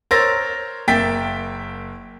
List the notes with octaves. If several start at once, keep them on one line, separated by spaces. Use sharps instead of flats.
A#4 C5 C#5 E6 A6 A#6
F#1 A#3 E5 G5 A6 B6